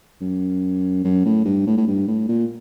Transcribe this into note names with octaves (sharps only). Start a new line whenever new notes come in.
F#2
F#2
A2
G2
A2
A2
G2
A2
A#2